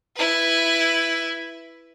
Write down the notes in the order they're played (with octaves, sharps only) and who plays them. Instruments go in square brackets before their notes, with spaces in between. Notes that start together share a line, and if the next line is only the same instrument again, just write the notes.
[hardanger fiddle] E4 B4